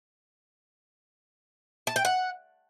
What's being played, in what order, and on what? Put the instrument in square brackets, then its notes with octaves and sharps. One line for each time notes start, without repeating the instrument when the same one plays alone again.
[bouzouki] A5
G5
F#5